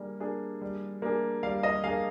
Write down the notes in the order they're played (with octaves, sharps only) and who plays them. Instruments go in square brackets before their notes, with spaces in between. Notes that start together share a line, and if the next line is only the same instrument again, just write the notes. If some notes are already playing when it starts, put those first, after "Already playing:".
Already playing: [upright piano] G3 A#3 D4 G#4
A#3 D4 G#4
G3
A#3 D4 G#4
[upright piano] G3 [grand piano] F5
[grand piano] D#5
[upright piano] A#3 D4 G#4 [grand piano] F5